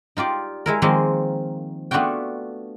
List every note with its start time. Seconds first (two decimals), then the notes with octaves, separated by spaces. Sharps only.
0.17 D#4 F4 G4 D5
0.66 G#3 E4 A#4
0.82 D#3 F3 G#3 A#3 C4
1.91 A3 B3 D4 F4 F#4 G5